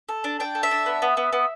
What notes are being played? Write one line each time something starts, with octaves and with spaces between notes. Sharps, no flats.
A4
D4
D4 G5
A4
E5
D4
B3
B3
B3
B3